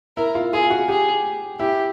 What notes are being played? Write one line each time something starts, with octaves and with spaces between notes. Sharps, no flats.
E4 A#4
F4
F4 G#4
F#4
G4 G#4
E4 G4